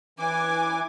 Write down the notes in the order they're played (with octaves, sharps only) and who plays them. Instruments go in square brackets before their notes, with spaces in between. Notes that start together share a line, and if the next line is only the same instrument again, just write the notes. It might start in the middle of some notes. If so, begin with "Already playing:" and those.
[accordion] E3 D6 [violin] G#5